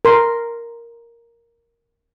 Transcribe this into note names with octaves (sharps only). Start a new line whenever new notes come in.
A#4 C6